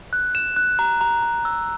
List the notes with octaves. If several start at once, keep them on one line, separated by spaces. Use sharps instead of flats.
F#6
E7
F#6
A#5
A#5
A#5
E6